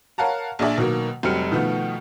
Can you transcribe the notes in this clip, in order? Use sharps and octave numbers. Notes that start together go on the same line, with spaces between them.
A#4 C#5 F5 F#5 A5 A#5
A#1 D4 G#4 D5 E5
B2 D#3 F#3 A#3
F1 F#3 G3 C4 F6 C#7
B2 D#3 F3 A3 B3